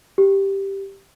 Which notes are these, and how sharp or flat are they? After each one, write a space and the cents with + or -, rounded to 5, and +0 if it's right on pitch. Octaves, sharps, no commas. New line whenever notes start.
G4 +0